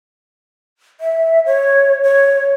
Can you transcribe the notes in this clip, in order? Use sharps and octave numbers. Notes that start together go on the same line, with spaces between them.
E5
C#5
C#5